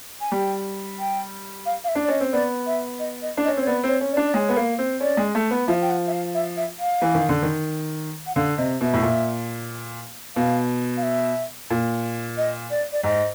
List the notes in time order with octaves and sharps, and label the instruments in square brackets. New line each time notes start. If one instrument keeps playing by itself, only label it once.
[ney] G#5
[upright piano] G3 [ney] G5
[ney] G5
F5
F5
E5
[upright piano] D4
[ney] D5
[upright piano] C#4 [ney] D#5
[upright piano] C4
[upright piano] B3 [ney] D5
[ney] E5
D#5
D#5
[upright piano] D4
[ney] D#5
[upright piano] C#4
[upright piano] C4 [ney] C#5
[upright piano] B3 [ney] D5
[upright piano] C4 [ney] C5
[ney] C#5
[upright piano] C#4
[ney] D5
[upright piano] D4
[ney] D5
[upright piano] G#3 [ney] C#5
[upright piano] B3
A#3
C4
[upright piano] C#4 [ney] D5
[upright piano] G#3
A3
B3
[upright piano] F3 [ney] E5
[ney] G5
F#5
E5
F5
E5
E5
F5
[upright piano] E3
D#3
D3
D#3
[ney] F#5
[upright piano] D3 [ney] F5
[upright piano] C3 [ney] D#5
[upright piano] B2 [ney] E5
[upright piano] A2
A#2
[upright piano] B2 [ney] F5
[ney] F5
E5
[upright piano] A#2
[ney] D#5
D5
D5
[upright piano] G#2 [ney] D#5